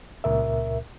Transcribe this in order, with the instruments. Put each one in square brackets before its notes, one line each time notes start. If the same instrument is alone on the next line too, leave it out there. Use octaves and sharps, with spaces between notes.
[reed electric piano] C#2 A#2 A#4 E5